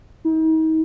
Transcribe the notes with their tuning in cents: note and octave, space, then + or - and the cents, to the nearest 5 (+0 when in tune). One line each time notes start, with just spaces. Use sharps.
D#4 +40